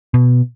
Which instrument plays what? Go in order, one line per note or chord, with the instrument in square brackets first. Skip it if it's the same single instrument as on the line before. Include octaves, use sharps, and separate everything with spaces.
[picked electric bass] B2